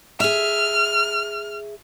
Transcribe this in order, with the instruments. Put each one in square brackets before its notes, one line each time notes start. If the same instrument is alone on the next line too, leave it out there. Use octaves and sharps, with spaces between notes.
[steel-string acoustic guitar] G#4 E5 [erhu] F6